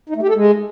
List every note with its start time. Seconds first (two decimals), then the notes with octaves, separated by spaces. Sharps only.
0.09 D#4
0.16 A3
0.22 G4
0.29 A4
0.35 G#3